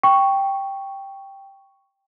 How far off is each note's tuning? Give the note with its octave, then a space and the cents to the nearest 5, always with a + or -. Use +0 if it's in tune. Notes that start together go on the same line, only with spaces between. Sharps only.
G5 +0 C#6 +0